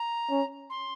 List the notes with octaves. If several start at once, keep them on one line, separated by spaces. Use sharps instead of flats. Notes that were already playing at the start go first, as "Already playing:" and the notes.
Already playing: A#5
C#4
C6